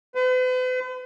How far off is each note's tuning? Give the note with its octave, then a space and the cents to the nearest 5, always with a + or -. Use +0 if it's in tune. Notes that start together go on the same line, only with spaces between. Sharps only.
B4 +45